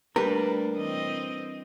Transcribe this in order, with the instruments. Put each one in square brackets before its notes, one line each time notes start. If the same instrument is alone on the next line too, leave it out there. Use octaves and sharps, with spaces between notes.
[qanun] G3 B4 [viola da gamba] A3 A#3 D4 [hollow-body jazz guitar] A#4
[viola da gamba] E3 C4 D#5